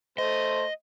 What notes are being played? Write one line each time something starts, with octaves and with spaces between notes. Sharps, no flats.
A3 C5 D#5